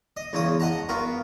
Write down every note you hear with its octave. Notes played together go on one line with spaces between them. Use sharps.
D#5
E2 C#3 G#3 D#6
D#5 F#5 A5 A#5
B3 F4 F#4 A#4